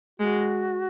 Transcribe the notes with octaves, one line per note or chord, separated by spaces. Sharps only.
G#3 F#4